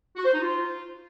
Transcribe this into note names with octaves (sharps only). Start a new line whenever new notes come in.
F#4
C5
D#4
F4